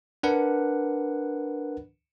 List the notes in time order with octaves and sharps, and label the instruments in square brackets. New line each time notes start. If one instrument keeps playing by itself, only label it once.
[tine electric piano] D4 A#4 B4 F#5